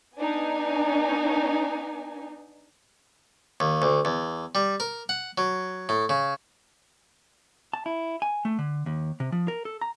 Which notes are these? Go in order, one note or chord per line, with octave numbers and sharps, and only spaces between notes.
B3 D4 D#4 G#5
D#2
D2
E2
G3
A#4
F#5
F#3
A2
C#3
A5
E4
G#5
A3
D3
D#2
C3
F3
A#4
A4
A#5